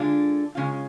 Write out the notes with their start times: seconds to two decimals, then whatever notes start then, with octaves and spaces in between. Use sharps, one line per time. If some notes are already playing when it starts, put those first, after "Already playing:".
Already playing: D3 G#3 D4 F4
0.55 C#3 G#3 C#4 F4